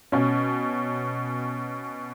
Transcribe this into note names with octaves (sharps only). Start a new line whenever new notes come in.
B2 C#4